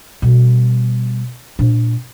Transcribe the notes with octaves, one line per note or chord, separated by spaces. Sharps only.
B2 G3
A#2 D4